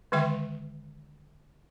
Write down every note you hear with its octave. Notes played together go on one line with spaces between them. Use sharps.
D3 D#3 G#3 E5 G5 C#6